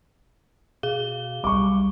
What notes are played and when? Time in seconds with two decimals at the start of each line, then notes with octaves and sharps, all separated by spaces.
0.83 B2 G#4 F5 G7
1.44 B1 G3 C#6 D6